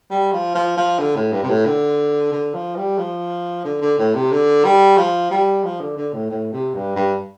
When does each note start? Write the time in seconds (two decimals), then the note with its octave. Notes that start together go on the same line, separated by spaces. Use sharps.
0.10 G3
0.33 F3
0.55 F3
0.77 F3
0.99 D3
1.16 A2
1.32 G2
1.43 C3
1.49 A2
1.65 D3
2.32 D3
2.54 F3
2.76 G3
2.98 F3
3.65 D3
3.81 D3
3.98 A2
4.14 C3
4.31 D3
4.65 G3
4.97 F3
5.31 G3
5.64 F3
5.81 D3
5.97 D3
6.13 A2
6.31 A2
6.53 C3
6.74 G2
6.96 G2